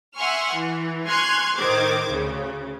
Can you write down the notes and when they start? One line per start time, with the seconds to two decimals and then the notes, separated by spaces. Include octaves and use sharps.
0.16 E5 F#5 G#5 C6 C#6 F6
0.53 E3
1.08 G#5 C6 C#6 F6 F#6 G#6
1.56 A2 D#3 C5 D6 G#6
2.10 D2 C#3